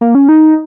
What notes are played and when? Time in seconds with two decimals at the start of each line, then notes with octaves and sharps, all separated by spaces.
0.01 A#3
0.15 C#4
0.29 D#4